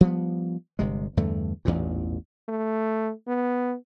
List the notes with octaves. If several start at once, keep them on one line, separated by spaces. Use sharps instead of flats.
F3 G3 A3 B3
G1 C3 G#3
E2 G2 D3 A3
A1 E2 G2 A#2
A3
B3